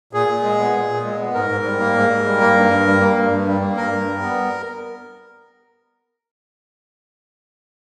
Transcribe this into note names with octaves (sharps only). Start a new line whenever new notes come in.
A#2 G#4
A#2
G#3
B3
A#2
A#2
G#3
B3
G#2 A#4
G#2
G3
A#3
G#2
G#2
G3
A#3
G2
G2
G3
A#3
G2
G2
G3
A#3
G2 A#4
G2
G3
B3